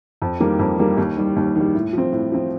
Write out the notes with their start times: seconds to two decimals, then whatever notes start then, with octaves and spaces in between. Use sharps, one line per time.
0.22 F2
0.40 D#3 G3 A#3
0.59 F2
0.79 D#3 G3 A#3
0.97 D#2
1.17 D#3 G3
1.36 D#2
1.55 D#3
1.60 G3
1.75 A2
1.93 F3 C4
2.12 A2
2.32 F3 C4